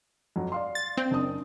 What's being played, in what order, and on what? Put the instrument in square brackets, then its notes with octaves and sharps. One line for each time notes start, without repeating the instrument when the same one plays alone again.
[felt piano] F2 F#3
D5 F5 C6
[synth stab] A6
C4
[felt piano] F#1 D4 D#6